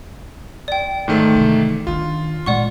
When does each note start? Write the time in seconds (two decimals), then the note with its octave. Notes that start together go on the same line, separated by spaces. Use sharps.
0.68 D5 G5
1.08 G#2 D#3 A3
1.34 C3 E3
1.87 D#3 D4 F4
2.46 A#2 G#3 D5 F#5 C#6